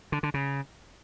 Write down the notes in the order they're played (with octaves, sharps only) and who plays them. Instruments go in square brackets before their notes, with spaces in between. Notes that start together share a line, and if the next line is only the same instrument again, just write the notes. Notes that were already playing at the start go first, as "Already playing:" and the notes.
[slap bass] D3
D3
C#3